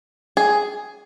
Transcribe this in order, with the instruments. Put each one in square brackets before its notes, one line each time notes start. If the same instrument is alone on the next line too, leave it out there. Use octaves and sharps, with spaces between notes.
[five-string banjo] G#4